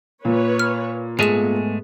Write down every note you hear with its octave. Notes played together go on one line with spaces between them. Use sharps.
A#2 B4 C#5
F6
G#2 G#3 A3 B3 G#4 E7